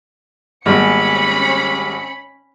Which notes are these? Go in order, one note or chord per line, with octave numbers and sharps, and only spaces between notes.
G#1 G3 A#3 B3 C#4 B5 C#7